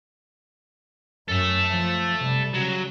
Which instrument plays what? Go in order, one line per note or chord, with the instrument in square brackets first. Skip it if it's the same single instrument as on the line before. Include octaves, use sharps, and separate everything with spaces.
[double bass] F#2 [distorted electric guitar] A4 E5
[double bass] F3
C3 G3
[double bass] C#3 [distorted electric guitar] F#3